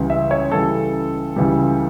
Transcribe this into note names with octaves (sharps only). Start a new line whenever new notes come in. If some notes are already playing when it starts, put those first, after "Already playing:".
Already playing: C#2 C#3 E3 G3
E5
C#5
C#2 C#3 E3 G3 A4
C#2 C#3 E3 G3